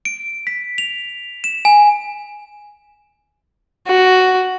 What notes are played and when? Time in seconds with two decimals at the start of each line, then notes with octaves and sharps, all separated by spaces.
0.05 D7
0.47 B6
0.78 F7
1.44 E7
1.65 G#5
3.87 F#4